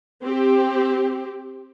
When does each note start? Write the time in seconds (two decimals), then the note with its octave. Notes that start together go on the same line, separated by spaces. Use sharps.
0.23 C4 G4